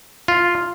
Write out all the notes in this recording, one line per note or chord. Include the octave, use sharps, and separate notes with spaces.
F4